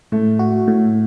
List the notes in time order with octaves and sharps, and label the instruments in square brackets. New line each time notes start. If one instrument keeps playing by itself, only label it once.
[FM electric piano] A2 [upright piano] A3
[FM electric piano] F#4
A2